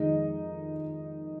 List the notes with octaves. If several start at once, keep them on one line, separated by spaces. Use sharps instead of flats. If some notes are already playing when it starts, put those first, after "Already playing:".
Already playing: F2 D#3 G#3 D#4 D#5